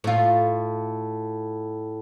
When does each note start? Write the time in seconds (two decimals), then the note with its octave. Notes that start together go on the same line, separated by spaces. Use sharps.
0.04 A2 F4